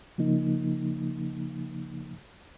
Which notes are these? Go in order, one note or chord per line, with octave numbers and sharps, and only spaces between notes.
C#3 F3 A#3 D#4